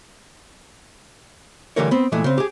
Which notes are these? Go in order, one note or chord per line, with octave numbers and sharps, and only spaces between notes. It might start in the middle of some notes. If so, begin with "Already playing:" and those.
D3 E3 G3 A3 A#4 C#5
B3 C4
A#2 E3 G#3 A3 G#4
C#3 C4
G4 G#4